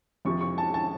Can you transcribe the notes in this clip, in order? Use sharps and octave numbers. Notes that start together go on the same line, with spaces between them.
F2 C3 F3 C#6
C#6
A5
A5